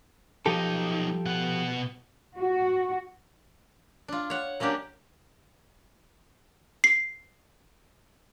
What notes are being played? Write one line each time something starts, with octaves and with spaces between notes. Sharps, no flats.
B1 F3 D#4 G4 A4
B2 F#5
F#4
D4 F4
C#5 F#5
F#3 A#3 C#4 D4 G4
C7